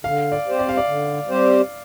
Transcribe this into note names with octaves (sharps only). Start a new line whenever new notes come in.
D3 F5
D5
G3 C4 G4 C5
D5
F5
D5
D3
G3 C4 G4 C5